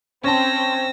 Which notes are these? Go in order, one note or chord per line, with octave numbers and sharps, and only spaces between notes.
C4 C#4 A5 E6 A#6